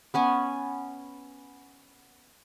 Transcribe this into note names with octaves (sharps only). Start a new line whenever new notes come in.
B3 C#4 G#5